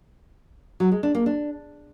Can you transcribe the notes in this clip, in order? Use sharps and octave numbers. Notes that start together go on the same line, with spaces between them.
F#3
G#3
D4
A#3
D4